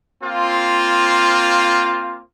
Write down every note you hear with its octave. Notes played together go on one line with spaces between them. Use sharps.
A#3 C4 F4